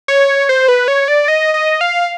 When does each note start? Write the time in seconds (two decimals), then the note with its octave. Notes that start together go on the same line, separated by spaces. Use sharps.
0.08 C#5
0.49 C5
0.68 B4
0.88 C#5
1.08 D5
1.28 D#5
1.54 D#5
1.81 F5